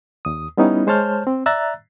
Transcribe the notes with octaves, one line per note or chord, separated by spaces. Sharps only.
D#2 D#6
G3 B3 C#4 D#4 E4
G#3 C5 C#5 A5 F6 G6
C4
D5 E5 A#5 E6 F#6 A6